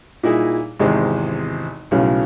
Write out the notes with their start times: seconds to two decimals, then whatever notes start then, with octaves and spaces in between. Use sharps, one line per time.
0.23 A#2 D#4 E4 G#4
0.79 G#1 E2 C3 G#3 D#4
1.91 B1 A2 C#3 F#3